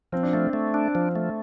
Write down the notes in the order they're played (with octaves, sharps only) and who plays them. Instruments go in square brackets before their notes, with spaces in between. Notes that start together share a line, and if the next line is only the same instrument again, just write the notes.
[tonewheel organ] F3 [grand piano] C4
[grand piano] D4
[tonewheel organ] A3 [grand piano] C4
[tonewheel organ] A3
D4
F3
A3